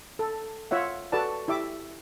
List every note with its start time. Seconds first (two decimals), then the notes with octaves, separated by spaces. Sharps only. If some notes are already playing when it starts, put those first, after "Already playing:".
0.19 A4
0.71 F4 C#5 E5 F#5
1.12 F#4 A4 B4 D5 A5
1.48 E4 G4 E5 D6